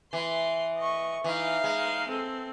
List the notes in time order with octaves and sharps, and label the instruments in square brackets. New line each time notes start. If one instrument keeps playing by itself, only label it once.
[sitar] E3 [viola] C6
[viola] D#5 C#6
[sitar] E3 [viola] D#4 F5
[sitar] G#3
[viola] C4 A4